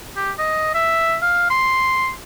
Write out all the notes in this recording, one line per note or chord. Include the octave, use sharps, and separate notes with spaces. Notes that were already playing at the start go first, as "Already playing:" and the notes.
G4
D#5
E5
F5
C6